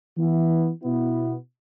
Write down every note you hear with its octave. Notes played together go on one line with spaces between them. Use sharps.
E3 B3 E4
B2 B3 E4